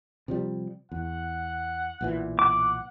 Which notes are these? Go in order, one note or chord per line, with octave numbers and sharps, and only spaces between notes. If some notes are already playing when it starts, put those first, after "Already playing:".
C3 F3 G3
E2 F#5
B1 A#2 E3
F#5 D6